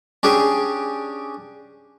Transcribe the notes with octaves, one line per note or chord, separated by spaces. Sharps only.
C#4 D4 G4 G#4